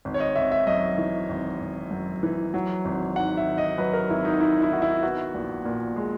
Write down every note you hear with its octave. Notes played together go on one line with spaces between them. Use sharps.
G#1
C#5
D#5
G#1 E5
E5
F#2 D#5
E3
G#1
G#1
F#2
E3
F#3
G#1
G#2 F#5
E5
D#3
D#5
F#3 B4
A#4
G#1 E4
D#4
G#2 E4
E4
D#3 F#4
E4
B3 F#4
A#1
A#2
G#3